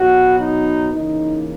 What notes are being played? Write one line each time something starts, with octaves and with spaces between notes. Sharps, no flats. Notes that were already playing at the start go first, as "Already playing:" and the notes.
Already playing: B2 F#3 B3 F#4
D#4
C#3 E3 A#3 D#4